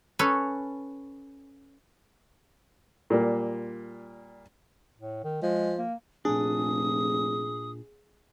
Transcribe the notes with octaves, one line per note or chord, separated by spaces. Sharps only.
C#4 A4 B4 C#5
A#2 G3 A#3
A2
D#3
F3 G#3
A#3
F1 A#2 D4 G#4 D#6